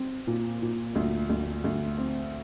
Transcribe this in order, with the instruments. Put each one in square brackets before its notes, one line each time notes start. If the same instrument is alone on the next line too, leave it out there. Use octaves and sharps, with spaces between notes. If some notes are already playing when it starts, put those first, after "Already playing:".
Already playing: [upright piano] C4
A#2
A#2
D2
D2
D2
C4